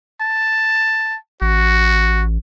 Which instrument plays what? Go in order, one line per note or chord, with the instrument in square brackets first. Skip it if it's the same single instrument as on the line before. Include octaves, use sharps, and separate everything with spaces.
[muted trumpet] A5
[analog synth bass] A1 [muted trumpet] F#4